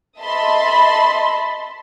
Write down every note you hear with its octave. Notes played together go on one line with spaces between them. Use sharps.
D#5 E5 A5 B5 C6